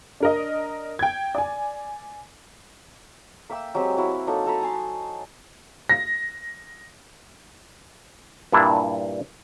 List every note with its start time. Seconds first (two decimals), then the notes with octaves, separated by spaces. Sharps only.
0.20 D4 A#4 D#5
0.99 G5 G#6
1.35 D5 G#5
3.49 A#3 E5 G5 E6
3.75 F#3 G#3 C4 G4
3.97 E4 F#4 A#4
4.27 F#3 A#3 D#4 A4
4.46 A4 A#5 B5 D#6
4.63 G#5 A5 C6
5.89 A#6
8.52 G2 A#2 G3 D4 E4